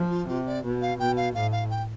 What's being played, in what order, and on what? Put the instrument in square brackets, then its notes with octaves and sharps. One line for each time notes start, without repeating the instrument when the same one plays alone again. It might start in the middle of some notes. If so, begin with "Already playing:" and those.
Already playing: [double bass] F3
[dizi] F4
[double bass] C3 [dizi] F4
[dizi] D5
[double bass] B2
[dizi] F5
[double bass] B2 [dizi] G5
[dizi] F5
[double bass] A2 [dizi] F5
[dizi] F5
G5